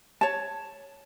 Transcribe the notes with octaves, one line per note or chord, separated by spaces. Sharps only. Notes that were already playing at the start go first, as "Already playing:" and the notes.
C#5 A5